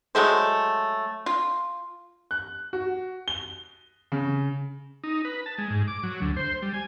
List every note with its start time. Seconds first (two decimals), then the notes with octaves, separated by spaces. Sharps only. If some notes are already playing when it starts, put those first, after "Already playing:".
0.15 F#3 G#3 A3 C5
1.26 F4
2.31 F#6
2.73 F#4
3.28 G7
4.12 C#3
5.04 D#4
5.25 B4
5.46 A5
5.58 G#3
5.70 G#2
5.88 D6
6.03 F#3
6.21 D2
6.37 C5
6.62 G3
6.74 G#5